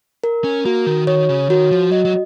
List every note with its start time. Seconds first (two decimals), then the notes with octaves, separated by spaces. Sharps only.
0.24 A#4
0.44 C#4
0.65 A#3 F#4
0.87 D#3
1.07 D#3 C#5
1.29 C#3
1.50 D#3 F#4
1.71 F3
1.92 F#3 D#5
2.05 F#3